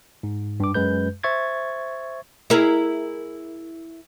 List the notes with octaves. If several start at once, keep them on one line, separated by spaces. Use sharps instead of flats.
G#2
G2 D6
F#2 G#3 B4 G6
C5 E5 C#6 G#6 A6
E4 G#4 A#4